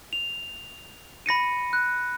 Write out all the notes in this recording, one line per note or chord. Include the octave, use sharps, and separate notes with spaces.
F7
B5 A#6 C#7 D#7
F#6